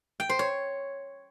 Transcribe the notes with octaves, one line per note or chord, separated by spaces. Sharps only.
G5
C5
C#5